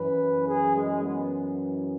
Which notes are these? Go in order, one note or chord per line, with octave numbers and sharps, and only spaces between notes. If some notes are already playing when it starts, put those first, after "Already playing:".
Already playing: F#2 E3 B4
G#4
G#3
B3